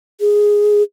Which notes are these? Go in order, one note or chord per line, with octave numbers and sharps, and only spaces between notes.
G#4